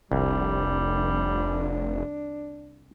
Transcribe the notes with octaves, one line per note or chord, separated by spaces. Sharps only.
F1 C2 G3 D4